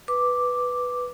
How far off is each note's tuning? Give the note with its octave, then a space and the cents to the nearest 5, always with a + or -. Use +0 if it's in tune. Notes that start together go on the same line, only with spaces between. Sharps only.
B4 +0 D6 +0